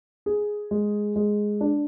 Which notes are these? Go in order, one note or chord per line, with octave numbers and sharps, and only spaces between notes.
G#4
G#3
G#3
D4